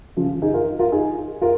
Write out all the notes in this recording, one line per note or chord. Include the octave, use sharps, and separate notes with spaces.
C#3 F3
D#4 G#4
F4 A#4
F4 A#4
D#4 G#4
F4 A#4